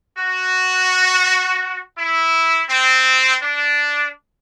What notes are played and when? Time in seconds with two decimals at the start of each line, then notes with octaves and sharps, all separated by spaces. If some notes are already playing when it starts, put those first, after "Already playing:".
0.18 F#4
1.97 E4
2.69 C4
3.42 D4